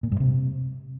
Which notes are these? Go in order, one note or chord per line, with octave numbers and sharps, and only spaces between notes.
A#2
G2
C3